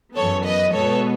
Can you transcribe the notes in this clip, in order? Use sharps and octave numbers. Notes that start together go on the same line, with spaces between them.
F#2 E3 B3 A4 C#5
B4 D#5
B2 G#3 B3 A4 C#5